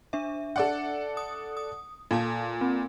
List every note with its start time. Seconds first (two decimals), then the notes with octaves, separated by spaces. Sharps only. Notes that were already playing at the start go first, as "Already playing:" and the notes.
0.13 D4 E5
0.56 A4 D5 F#5
1.17 D#6
1.57 D#6
2.11 A#2 A4 F5 A5
2.61 C4